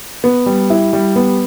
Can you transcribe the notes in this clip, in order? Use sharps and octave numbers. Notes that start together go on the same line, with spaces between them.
B3
G3
E4
G3
B3